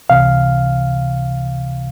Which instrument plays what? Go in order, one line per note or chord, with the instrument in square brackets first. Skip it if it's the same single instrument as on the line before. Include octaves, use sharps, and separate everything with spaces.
[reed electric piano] C#2 C3 E3 F5